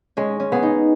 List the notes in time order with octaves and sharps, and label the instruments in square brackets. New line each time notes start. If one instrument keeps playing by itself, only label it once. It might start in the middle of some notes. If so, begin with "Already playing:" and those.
[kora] G#3 [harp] C#4
[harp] C#4
[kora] B3 G#4
[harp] D#4